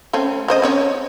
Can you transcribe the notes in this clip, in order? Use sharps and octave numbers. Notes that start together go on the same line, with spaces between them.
A3 C4 C#4
C#3 C5 D#5
C4 C#4 C#5